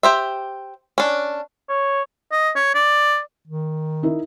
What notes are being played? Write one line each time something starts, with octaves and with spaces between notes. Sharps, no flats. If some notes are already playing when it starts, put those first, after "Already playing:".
G4 C5 E5
C#4 D4
C#5
D#5
C#5
D5
D#3
D#4 E4 A#4